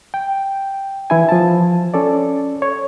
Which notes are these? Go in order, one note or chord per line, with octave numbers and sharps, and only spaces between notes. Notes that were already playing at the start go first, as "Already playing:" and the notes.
G5
E3 E4 G#5
F3 A5
C#4 A4 D5
C#5